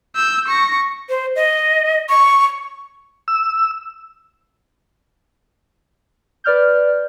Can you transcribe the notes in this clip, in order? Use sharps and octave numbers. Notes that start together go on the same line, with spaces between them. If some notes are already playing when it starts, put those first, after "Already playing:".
E6 G6
C#6 A#6
C5
D#5
C#6
E6
B4 D5 F6 G6